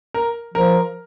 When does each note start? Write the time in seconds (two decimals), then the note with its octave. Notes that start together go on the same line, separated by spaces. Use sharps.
0.14 A#4
0.54 F3 A#4